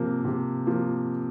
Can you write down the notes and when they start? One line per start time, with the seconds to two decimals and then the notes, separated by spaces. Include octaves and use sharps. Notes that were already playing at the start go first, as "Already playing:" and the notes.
Already playing: C3 F3 A#3
0.25 C3
0.67 F3 A#3